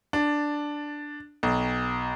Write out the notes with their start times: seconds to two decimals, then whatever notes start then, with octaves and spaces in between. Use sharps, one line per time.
0.13 D4
1.43 B1